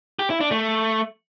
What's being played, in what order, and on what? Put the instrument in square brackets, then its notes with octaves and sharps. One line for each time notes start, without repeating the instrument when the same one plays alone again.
[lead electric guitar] G4
E4
D4
A3